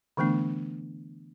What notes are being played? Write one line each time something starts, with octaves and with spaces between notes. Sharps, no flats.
D3 E3 A3 B3 D4